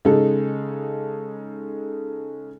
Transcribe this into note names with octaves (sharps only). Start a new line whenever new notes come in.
C#3 G#3 D#4 A4